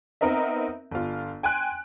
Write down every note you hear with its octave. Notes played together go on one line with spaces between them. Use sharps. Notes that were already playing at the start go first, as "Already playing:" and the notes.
B3 C4 D#4 A#4 D#5 E5
G1 F4
G5 G#5 C6 F#6 D7